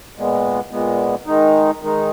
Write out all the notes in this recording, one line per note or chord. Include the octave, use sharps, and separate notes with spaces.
A#2 G#3 B3
A#2 G#3 B3
D#3 G#3 D#4
D#3 G#3 D#4